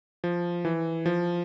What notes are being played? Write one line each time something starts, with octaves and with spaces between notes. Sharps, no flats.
F3
E3
F3